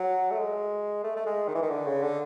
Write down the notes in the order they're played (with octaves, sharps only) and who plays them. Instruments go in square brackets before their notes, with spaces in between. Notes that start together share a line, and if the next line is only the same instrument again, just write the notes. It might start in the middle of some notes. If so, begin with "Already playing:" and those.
Already playing: [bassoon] F#3
A3
G#3
A3
A3
G#3
D#3
E3
D#3
D3
C#3
D3